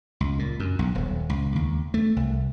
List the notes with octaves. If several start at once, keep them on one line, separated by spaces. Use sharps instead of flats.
C#2
A#2
F#2
B1
D#1
C#2
D#2
A3
C2